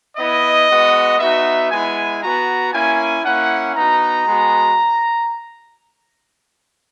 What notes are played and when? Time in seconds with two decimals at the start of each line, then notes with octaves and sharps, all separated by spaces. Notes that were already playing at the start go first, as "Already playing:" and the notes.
0.17 B3 E4 D#5
0.69 G#3 B3 F#4
1.19 B3 D#4 F#4 E5
1.71 G#3 B3 E4 G#5
2.22 B3 F#4 A#5
2.73 A#3 C#4 E4 G#5
3.25 A#3 C#4 E4 F#5
3.75 B3 D#4 F#4 A#5
4.27 G#3 B3 F#4